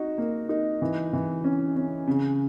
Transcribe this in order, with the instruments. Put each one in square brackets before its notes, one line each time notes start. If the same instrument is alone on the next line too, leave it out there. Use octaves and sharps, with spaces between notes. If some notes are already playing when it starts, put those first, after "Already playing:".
Already playing: [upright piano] D#4 F#4
A#3
D#4
E3
E3
C#4
C#4
C#3